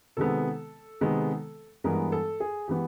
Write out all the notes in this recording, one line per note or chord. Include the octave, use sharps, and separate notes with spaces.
C3 D#3 G#3 B3 A4
C3 D#3 G#3 B3
G2 E3 G#3 B3 A#4
A4
G#4
E3 G#3 B3 G4